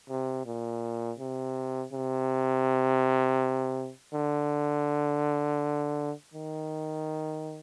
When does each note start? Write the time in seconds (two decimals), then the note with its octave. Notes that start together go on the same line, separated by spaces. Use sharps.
0.09 C3
0.46 A#2
1.19 C3
1.93 C3
4.14 D3
6.34 D#3